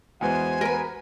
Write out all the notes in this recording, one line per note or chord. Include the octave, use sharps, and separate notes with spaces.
E2 G#3 B3 F#4 C5 G#5
A#4 B4